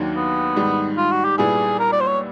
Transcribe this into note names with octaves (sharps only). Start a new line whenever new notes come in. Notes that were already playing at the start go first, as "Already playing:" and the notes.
Already playing: D#2 D#3 F#3 A#3 D4
B3
G#2 D#3 G3
F4
F#4
G4
A#2 G3 B3 E4 G#4
A#4
D5
C5
C#5